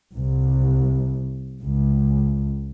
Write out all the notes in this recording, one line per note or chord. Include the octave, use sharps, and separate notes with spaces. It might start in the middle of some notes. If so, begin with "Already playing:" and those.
C2
C#2